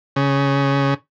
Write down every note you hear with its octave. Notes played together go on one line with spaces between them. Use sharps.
C#3